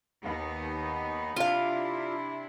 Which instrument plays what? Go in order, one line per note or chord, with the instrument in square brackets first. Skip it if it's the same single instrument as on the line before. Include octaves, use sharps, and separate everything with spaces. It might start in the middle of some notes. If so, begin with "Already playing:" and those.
[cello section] D#2 B3 D#4
[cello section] C3 D4 E4 [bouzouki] F4 F5